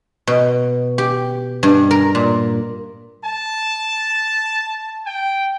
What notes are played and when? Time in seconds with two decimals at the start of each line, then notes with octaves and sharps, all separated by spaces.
0.27 B2
0.98 G4
1.63 G2
1.91 A#4
2.15 A#2
3.24 A5
5.05 G5